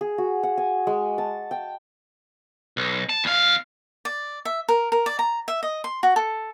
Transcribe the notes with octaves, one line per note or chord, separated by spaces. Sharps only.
G#4
F#4
F#5
G#5
G#3
A5
G5
B1
A5
E2 F5
D5
E5
A#4
A#4
D5
A#5
E5
D#5
C6
F#4
A4